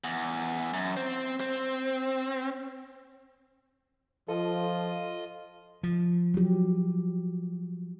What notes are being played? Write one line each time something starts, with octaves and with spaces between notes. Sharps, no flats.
E2
F#2
C4
C4
F3 F4 A4 D#5
F3
F#3 G4